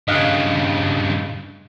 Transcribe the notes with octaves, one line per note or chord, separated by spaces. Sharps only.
G2 C#3 D#5 F5 F#6